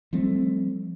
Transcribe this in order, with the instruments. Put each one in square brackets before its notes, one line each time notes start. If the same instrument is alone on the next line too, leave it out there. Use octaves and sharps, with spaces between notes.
[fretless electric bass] F3 G3 A3 C4